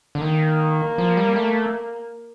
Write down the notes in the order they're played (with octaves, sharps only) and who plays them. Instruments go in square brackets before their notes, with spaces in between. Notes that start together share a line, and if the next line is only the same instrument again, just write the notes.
[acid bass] D3
[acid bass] D#3 [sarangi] A#3
[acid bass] F3
G3
A3